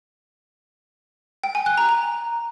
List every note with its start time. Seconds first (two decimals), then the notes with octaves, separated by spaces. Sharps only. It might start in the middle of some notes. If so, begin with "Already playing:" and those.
1.44 G5
1.55 G#5
1.66 F#6
1.77 A#5
1.89 A#5